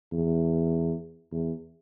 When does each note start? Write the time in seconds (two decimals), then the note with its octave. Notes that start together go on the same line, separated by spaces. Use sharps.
0.12 E2
1.31 E2